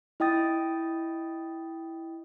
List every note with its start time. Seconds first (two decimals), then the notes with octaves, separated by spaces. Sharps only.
0.20 E4 D#5 G5 D#6 A6